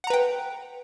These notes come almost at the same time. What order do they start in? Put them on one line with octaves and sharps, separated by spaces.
F#5 A#5 B4 G5